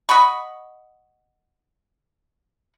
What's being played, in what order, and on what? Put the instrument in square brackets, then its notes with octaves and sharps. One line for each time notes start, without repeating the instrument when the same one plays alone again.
[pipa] D#5 F#5 B5 C#6